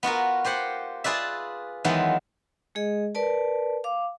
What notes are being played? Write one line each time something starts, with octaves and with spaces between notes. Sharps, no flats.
B3 F4 F#4 A#4
F4 G4 C5 F#5
F4 G#4 B4 D5 E5
D#3 E3 F#3 G#3 B3 F4
G#3 G#4 D#5
A#4 B4 D5 A5
F5 D6